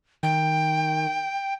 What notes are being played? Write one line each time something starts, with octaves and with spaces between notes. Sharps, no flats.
D#3 G5